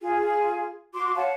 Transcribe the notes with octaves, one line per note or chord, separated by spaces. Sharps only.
F4 G#4
F#4 C6 D6
C#5 F5 F#5 A5